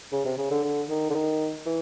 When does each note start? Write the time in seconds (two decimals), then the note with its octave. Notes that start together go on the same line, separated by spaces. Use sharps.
0.12 C#3
0.25 C3
0.38 C#3
0.51 D3
0.64 D3
0.89 D#3
1.10 D3
1.14 D#3
1.66 E3